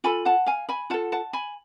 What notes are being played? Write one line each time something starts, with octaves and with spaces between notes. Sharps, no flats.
F4 A4 G#5 B5
F#5 A5
F5 G#5
G#5 B5
F4 A4 F#5 A5
F#5 A5
G#5 B5